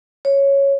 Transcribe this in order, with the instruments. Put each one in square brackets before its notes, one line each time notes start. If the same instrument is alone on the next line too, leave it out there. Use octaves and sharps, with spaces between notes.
[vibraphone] C#5